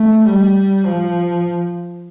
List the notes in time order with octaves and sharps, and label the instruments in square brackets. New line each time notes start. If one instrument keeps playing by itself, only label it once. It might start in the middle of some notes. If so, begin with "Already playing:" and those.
Already playing: [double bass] A3
G3
F3